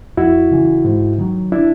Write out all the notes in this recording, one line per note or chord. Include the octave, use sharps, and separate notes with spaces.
F2 E4 F#4
C#3 E3
G#2
D#3 F#3
D4 E4